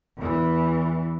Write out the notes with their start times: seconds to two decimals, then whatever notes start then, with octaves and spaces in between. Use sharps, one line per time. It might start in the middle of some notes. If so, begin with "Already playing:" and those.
0.17 E2 E3